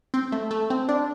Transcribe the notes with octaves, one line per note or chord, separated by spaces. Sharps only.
C4
A3
A3
C4
D4